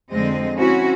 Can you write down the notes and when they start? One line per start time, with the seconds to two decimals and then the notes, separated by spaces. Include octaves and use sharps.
0.11 F2 D3 G#3 C4 D#5
0.59 C4 C#4 E4 F#4